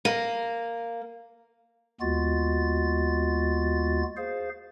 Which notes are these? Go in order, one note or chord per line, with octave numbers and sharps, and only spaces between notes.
A#3
D#2 G#3 B3 F4 F#4 A6
G#4 C5 F5